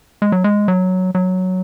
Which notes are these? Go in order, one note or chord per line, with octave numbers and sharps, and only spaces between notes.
G#3
F#3
G#3
F#3
F#3